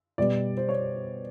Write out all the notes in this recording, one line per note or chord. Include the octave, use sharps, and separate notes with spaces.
B2 G3 B3 D5
C5
C#5